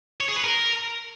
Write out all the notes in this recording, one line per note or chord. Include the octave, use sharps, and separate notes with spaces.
C#5
G#4
B4
A#4